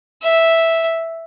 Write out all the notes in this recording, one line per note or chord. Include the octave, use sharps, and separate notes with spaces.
E5